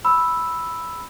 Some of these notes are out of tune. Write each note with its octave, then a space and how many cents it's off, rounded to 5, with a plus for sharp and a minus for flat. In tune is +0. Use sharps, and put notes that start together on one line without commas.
B5 +0 E6 +0